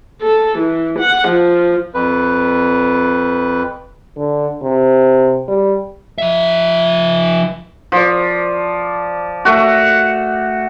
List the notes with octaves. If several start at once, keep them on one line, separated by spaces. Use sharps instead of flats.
A4
E3
F#5
F3
F2 B4
D3
C3
G3
F3 E5
F3 D5
A3 F#4